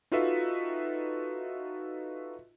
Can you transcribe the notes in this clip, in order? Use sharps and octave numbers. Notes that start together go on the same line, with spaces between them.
D#4 F4 F#4 A4 B4 E5